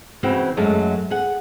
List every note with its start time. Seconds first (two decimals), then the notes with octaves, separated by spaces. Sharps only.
0.23 C#3 E3 C4 F#4 G5
0.57 F#2 F#3 G#3 A3
1.10 G#4 F#5